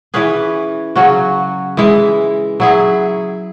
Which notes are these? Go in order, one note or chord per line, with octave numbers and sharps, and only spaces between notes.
E3 C#4 G#4 B4
C#3 F#3 C#4 F#4
E3 G#3 E4
F#3 E4 G#4